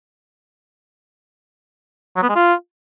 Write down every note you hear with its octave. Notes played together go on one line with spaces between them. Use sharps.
F#3
B3
G#3
F4